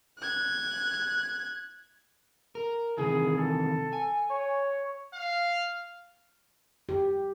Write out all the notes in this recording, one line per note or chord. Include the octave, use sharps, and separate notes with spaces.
F#6 G#6
A#4
C3 D#3 E3 G#4
A4
G#5
C#5
F5
G4